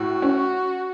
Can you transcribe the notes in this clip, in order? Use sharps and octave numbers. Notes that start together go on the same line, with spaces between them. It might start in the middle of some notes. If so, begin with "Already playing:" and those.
Already playing: A2 F#4
C#4